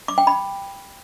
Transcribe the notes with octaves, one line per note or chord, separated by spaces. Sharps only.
D6
G5
B5